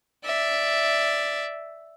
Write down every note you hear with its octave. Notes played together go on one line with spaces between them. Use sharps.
D5 E5